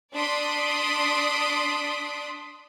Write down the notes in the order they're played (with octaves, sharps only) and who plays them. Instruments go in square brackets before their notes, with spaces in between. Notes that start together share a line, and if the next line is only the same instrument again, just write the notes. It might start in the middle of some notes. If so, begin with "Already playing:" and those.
[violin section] D4 D5 C6 D#6 B6 D7